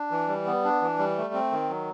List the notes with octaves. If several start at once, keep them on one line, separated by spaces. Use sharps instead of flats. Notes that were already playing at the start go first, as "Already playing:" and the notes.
Already playing: D4
E3
G3
B3
D4
E3
G3
A3
C4
D#3
F#3